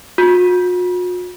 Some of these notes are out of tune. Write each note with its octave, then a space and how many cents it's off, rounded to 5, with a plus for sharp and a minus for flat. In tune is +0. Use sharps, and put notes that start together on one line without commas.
F#4 -45